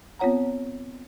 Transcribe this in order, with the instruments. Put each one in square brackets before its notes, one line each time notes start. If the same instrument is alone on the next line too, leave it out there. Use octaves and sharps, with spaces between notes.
[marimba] B3 C4 F4 C#5 F#5 A#5